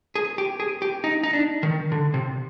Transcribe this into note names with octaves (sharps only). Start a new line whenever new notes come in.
G#4
G4
G#4
G4
D#4
D#4
D4
D#3
D3
C3